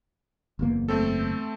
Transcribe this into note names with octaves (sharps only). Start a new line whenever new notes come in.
F#1 E2 A#3
A3 C4 A4